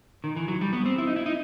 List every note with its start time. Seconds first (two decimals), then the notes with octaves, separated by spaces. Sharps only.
0.24 D#3
0.36 E3
0.48 F#3
0.61 G3
0.73 B3
0.86 C4
0.98 E4
1.07 D#4
1.16 E4
1.26 D#4